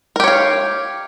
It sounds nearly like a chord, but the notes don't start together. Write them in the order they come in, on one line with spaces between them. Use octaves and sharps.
A#4 G4 C#5 F5